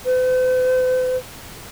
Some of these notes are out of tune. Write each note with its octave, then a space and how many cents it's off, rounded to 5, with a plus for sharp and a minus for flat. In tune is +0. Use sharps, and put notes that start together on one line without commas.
C5 -45